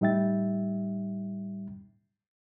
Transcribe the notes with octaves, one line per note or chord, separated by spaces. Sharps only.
A2 G3 D#4 E5 G5 A6